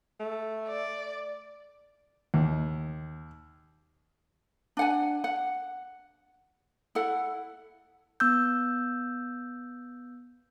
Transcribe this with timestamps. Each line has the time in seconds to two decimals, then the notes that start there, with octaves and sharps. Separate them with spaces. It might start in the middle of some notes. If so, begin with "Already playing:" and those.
0.20 A3
0.67 D5
2.34 D#2
4.77 D4 F#5 G#5
5.24 F#5
6.95 E4 A4 F#5
8.20 B3 E6 G6